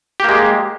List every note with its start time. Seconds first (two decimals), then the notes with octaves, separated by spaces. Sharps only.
0.20 G4
0.24 A#3
0.29 G#3